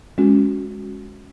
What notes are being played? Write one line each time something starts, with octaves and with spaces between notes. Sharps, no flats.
G#3 C#4 F#4